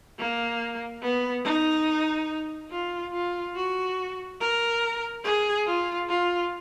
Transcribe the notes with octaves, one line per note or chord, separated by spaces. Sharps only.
A#3
B3
D#4
F4
F4
F#4
A#4
G#4
F4
F4